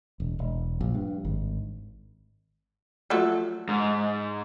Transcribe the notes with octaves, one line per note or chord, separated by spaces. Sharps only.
E1
E1
A#1
G2
G#1
F3 F#3 A3
G#2